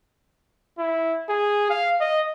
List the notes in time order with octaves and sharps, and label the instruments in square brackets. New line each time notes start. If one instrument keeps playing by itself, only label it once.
[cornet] E4
G#4
F5
D#5